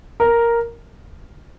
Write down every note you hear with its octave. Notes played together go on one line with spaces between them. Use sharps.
A#4